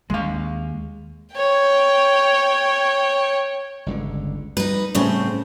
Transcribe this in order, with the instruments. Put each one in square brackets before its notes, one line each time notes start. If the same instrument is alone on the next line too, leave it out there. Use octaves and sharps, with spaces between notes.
[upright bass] D#2 [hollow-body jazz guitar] G#3 F5
[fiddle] C#5 G5
[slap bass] G1 C#2 D3
[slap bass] G3 [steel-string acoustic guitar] D#4 B4
[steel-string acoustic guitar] A2 C#3 C4 [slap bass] G3 A3